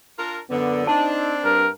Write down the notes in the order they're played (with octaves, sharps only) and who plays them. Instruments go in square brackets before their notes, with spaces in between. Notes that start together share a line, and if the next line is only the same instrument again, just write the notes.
[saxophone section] D4 F4 A#4
[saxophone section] F#2 D3 [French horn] B3
[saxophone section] C4 D4 [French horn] D#4 [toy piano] A5
[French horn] G2 [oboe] A#4